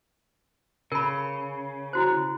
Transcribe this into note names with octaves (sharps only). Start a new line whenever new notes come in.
C#3 A#4 B5
E4 F#4 C5